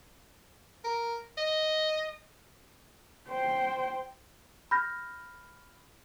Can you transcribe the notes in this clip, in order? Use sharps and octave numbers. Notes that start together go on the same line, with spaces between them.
A#4
D#5
C5 G5
B5 F6 G6 A#6